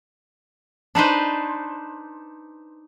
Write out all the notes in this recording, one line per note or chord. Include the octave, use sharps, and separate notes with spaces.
D4 D#4 B4 C5